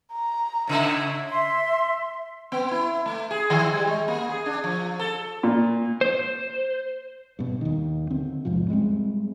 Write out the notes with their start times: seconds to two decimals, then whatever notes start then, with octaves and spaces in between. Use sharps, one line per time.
0.13 A#5
0.67 A2 C#3 E4
1.29 E5 C6
2.52 B3
2.71 E4
3.06 A3
3.31 G#4
3.50 D#3
3.73 G3
3.87 G#3
4.08 A#3
4.29 G#4
4.46 D4
4.64 F3
4.99 A4
5.43 A#2
6.01 C5
7.39 G2 B2
7.61 D#2 D#3
8.10 D3 C4
8.45 E2 G#2 C3 F3
8.68 G3 G#3 A#3 C4